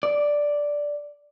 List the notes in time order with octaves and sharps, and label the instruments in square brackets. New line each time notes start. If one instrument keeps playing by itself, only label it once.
[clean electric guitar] D5